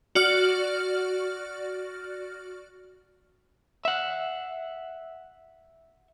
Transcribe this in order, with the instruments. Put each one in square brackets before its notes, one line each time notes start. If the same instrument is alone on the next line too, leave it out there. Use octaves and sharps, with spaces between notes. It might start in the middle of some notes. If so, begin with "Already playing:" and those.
[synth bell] F#4 D5 F6
[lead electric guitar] E5 F#5